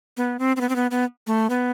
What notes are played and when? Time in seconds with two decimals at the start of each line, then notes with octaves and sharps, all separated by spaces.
0.17 B3
0.39 C4
0.56 C4
0.61 B3
0.69 C4
0.76 B3
0.91 B3
1.27 A3
1.50 B3